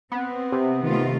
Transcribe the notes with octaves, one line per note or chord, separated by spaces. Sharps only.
B3 C4
C3
D#3 A3 F4